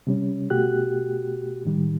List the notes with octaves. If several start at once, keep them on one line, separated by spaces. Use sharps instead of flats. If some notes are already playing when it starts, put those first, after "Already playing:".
C3 G3 C#4
B2 A3 F#4 G4 F#6
A2 D#3 G3